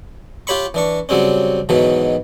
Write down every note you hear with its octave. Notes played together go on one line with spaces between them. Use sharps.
F4 G4 C#5 B5 C#6
E3 D4 C#6
C#3 F#3 G3 C4 C#4
G#2 B2 D#3 E3 F#3